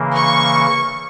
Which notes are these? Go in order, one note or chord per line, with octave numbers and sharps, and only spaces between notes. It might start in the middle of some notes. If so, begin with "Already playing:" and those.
Already playing: C#3 E3 A#3
C#6